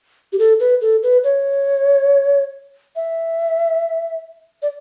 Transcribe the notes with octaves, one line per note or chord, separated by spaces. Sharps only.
G4
A4
B4
A4
B4
C#5
E5
D5